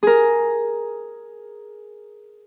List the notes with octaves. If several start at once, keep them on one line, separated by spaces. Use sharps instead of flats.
G#4 A#4